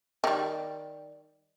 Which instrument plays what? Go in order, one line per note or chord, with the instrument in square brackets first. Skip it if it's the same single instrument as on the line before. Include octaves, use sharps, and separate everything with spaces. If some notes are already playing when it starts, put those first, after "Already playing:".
[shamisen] D#3 G3